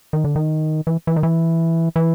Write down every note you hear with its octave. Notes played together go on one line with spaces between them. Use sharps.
D#3
D3
D#3
E3
E3
D#3
E3
E3